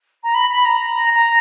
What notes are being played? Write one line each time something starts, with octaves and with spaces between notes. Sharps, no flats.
A#5
B5
B5
A#5
A#5